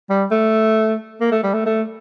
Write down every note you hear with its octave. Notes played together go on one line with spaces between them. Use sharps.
G3
A3
A#3
A3
G3
A3
A3